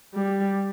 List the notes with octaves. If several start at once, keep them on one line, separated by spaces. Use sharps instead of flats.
G3